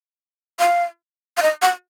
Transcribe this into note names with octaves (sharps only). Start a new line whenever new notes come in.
F5
F5
D#5
F#5